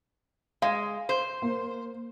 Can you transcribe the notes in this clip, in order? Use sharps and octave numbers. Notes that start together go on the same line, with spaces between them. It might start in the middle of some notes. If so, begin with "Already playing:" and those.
G#3 F5
C5
A#3